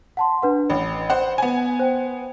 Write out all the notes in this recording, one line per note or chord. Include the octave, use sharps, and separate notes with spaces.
F#5 A5 C6
D4 B4 F#5
A1 B5
C5 F#5
B3 G#5
C5 G5